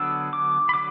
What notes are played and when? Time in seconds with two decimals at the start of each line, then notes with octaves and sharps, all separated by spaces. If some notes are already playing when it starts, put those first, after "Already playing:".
Already playing: D3 F#3 B3 D4 E6
0.33 D6
0.69 B5
0.74 D3 F#3 D6